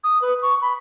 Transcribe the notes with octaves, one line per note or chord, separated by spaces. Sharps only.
D#6
B4
C#6
B5